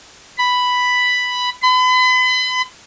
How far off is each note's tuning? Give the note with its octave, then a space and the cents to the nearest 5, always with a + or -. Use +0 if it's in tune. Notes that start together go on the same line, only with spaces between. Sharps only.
B5 +5
B5 +40